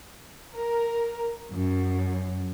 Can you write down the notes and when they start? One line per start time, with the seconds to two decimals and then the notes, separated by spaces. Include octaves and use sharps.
0.54 A#4
1.52 F#2